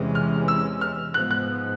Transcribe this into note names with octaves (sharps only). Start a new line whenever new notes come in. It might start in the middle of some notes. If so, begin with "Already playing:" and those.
Already playing: E2 C3 E3 G#3 C#4
F6
E6
F6
G#2 F3 G#3 B3 F#6
F#6